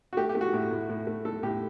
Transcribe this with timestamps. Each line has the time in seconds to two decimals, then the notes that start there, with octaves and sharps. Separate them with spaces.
0.13 F#4
0.17 A3 G4
0.29 G4
0.35 A3
0.41 F#4
0.54 A2
0.71 A2
0.89 A2
1.07 A3
1.25 A3 A4
1.43 A2 G4